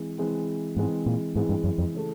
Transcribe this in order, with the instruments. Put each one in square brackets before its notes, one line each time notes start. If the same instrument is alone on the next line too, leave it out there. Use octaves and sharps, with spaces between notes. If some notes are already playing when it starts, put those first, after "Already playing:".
Already playing: [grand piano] E3 G#3 C4
E3 G#3 C4
[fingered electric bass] G#2 [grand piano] E3 G#3 C4
[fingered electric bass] A#2
[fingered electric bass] G#2 [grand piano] E3 G#3 C4
[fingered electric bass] G2
F#2
F2
[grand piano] C#3 E3 A3